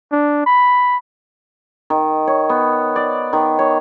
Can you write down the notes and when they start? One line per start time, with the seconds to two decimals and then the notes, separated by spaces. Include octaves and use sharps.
0.12 D4
0.46 B5
1.90 D#3
2.27 C#5
2.49 B3
2.96 D5
3.33 D#3
3.59 C#5